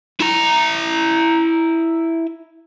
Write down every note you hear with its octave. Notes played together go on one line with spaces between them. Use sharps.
E4 A#5